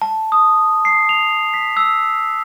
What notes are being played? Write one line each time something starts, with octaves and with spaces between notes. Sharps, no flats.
A5
D#6
C7
F7
B6
E6